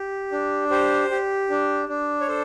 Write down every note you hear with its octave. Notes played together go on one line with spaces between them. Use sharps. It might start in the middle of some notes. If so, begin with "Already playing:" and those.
Already playing: G4
D4
G4 C5
G4
D4
D4
C#5
A4 C5